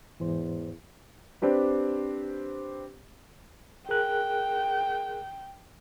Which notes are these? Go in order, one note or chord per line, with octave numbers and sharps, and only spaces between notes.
E2 G#2 E3 C5
C4 D4 G4 B4
G#4 A#4 G5 F#6